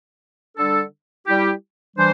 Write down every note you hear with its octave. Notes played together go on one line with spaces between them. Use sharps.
D3 G3 D4 A4
G3 E4 G4
E3 G3 D4 C5